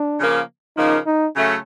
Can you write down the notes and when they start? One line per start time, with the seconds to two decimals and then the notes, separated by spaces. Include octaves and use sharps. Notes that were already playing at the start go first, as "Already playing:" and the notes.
Already playing: D4
0.19 C#3 F3 A#3
0.77 C#3 F3 A#3 D#4
1.07 D#4
1.35 C#3 F#3 A3 C#4